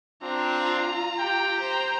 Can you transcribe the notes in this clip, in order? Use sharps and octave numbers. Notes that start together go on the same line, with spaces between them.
C4 D4 F4 A#5
G4 G5
C5 A#5